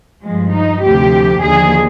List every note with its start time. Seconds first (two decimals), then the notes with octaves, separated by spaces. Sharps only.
0.24 G2 F3 G#3
0.54 D#4
0.83 D2 C3 F3 G4
1.43 D#2 D3 F3 G#4